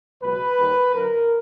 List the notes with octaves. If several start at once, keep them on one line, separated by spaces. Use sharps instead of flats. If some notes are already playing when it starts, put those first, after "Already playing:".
C#2 B2 F#3 B4
D#2 D#3 G3
F#2 D3 F#3 A#4